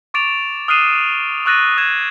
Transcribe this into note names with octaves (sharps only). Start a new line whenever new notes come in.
C#6 D6 A6 D7 E7 F7
D#6 F6 F#6 C7 D#7 E7
C#6 E6 F#6 A6 A#6 D#7
D#6 G#6 E7